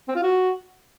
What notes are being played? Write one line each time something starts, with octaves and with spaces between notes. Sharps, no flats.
C4
F4
F#4